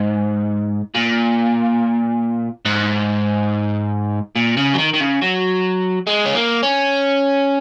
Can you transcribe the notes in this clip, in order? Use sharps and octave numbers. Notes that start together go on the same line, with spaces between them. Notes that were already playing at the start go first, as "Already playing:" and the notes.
Already playing: G#2
A#2
G#2
A#2
C#3
F#3
D#3
D#3
C#3
F#3
G#3
C#4
A#3
C#4